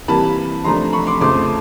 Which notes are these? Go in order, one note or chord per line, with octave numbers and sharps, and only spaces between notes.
C3 E3 G3 A#3 A5 B5
C3 F3 A3 D4 A#5 C6
B5 C#6
C6 D6
F2 C#3 F3 A3 C6 D6